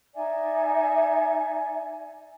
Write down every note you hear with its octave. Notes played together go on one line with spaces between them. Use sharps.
D#4 D5 E5 G#5